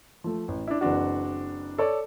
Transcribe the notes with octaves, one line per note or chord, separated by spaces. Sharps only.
F3 A3
A1
D4 E4
F#1 E3 C4 D4 F#4
A4 C#5 D5